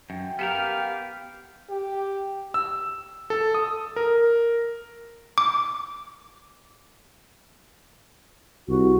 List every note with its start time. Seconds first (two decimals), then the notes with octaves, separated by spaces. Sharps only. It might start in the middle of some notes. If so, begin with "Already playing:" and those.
0.10 F#2 G5
0.39 B3 G4 A4 A#4 F5
1.70 G4
2.54 E6
3.30 A4
3.54 D#6
3.96 A#4
5.38 D6
8.68 C2 F#4